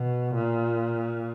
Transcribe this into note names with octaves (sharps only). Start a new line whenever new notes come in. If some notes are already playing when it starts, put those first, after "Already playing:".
Already playing: B2
A#2